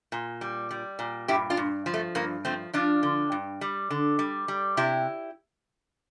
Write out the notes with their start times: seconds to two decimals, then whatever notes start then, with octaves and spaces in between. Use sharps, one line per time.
0.12 A#2
0.41 G3
0.71 G3
0.99 A#2
1.28 G2 E4 G4
1.50 D4 F4
1.57 G2
1.86 F3
1.94 A3
2.15 G2 A#3
2.45 F3 A3 C4
2.73 F3 D4 F4
3.03 D3
3.32 G2
3.61 G3
3.90 D3
4.19 G3
4.48 G3
4.77 C3 E4 G4